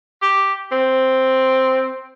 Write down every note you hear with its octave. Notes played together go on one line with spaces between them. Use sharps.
G4
C4